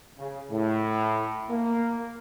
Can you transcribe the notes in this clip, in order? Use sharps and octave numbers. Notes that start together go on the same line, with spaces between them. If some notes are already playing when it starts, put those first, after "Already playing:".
C#3
A2
A#3